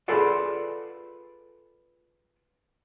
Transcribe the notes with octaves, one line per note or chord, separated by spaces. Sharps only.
F4 G#4 A4 B4 D5 F#5